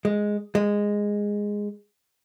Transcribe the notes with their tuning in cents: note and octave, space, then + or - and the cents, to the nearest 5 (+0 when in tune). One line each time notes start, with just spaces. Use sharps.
G#3 +0
G#3 -10